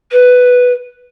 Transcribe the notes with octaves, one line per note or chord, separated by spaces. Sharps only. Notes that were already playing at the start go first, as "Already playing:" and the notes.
B4